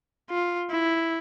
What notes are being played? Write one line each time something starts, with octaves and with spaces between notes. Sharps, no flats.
F4
E4